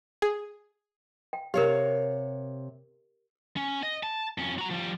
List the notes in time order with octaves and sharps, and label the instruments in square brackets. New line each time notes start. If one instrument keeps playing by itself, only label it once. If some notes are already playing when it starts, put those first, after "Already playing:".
[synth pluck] G#4
[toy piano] G5
[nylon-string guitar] C3 C#5 F5 [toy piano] G4 A#4
[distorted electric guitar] C#4
D#5
A5
F2 C#4
F#4 A#5
F3 G3